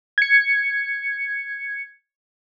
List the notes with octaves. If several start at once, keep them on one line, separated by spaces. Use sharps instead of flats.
G#6 C#7